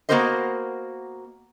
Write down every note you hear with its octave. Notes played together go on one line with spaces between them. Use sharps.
A#3 B3 F#4 A#4 C5 D#5